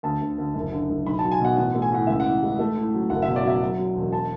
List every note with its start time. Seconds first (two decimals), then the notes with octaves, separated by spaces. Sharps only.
0.03 D2 A5
0.21 D2
0.38 D2
0.54 F#1
0.72 D3
0.89 F#1
1.06 B1 B5
1.19 A5
1.23 F#3
1.31 G#5
1.41 B2 F#5
1.56 A1 F#5
1.74 A3
1.82 G#5
1.92 A2 F#5
2.07 C#2 E5
2.20 E3 F#5
2.43 G#3
2.59 A3
2.76 A2
2.94 F#3
3.10 F#1 F#5
3.22 E5
3.28 B2
3.36 D5
3.44 F#3 E5
3.61 F#3
3.78 F#3
3.95 E1
4.13 A5